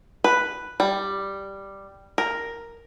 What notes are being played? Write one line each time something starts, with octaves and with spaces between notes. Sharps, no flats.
B4
G3
A#4